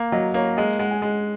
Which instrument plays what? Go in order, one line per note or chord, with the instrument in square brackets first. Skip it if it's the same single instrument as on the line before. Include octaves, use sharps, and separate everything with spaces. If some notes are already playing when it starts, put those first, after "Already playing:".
Already playing: [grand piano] A#3
[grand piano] F#3 [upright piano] D#5
[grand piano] A#3 [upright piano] C#5
[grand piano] G#3 [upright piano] D#5
[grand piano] G#3 [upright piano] F#5
[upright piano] G#5
[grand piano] G#3